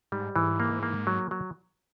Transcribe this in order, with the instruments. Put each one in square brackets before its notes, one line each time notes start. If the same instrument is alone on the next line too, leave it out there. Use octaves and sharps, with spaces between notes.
[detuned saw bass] G#2 [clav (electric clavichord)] G3
[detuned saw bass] G#2 [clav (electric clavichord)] E3
[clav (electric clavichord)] A#3
A#3
F#3
F#3